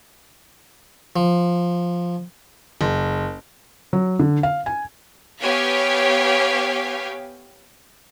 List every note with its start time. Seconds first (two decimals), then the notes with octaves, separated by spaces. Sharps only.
1.16 F3
2.81 F#1
3.93 F#3
4.20 D3
4.43 F5
4.66 G#5
5.41 B3 G4 C#5 F5 G5 G#5